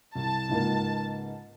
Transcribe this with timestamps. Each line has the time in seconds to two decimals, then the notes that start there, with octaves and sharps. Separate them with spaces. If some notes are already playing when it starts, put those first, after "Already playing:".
0.15 C2 A5
0.49 C#2 G#2 A#3